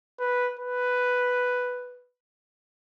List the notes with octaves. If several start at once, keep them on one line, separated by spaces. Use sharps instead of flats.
B4
B4